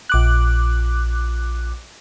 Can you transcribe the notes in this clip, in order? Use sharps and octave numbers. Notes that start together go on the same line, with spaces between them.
A#1 D6 F#6